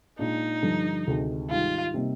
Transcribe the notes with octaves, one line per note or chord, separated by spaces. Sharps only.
A#2 G#3 D4 D#4 F4
G2 D3 F3
D2 C3 D#3 G#3
G#2 D#3 G3 F4
C3 G3 A#3 D#4